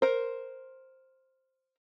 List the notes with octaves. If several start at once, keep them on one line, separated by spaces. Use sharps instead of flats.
A#4 C5